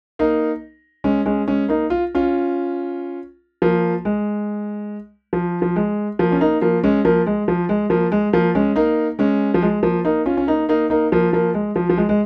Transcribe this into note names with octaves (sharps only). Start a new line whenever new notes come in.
A#3 D#4
G#3 C#4
G#3 C#4
G#3 C#4
A#3 D#4
F4
C#4 F4
F3 A#3
G#3
F3
F3
G#3
F3 A#3
C#4
A#3 D#4
F3 A#3
G#3 C#4
F3 A#3
G#3
F3
G#3
F3 A#3
G#3
F3 A#3
G#3 C#4
A#3 D#4
G#3 C#4
F3
G#3
F3 A#3
A#3 D#4
C#4 F4
C#4
A#3 D#4
A#3 D#4
A#3 D#4
F3 A#3
F3 A#3
G#3
F3
F3
G#3
G#3